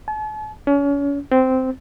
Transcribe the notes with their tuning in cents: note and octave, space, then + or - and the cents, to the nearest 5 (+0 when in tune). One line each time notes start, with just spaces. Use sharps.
A5 -45
C#4 +35
C4 -10